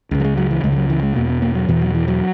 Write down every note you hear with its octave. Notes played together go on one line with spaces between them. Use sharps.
C#2 C#3
F#3
G#3
F#3
E3
C#2 C#3 G#3
E3
F#3
E3
G#3
E2 B2 A#3
B3
A#3
F#3
E2 B2 E3
F#3
E3
F#3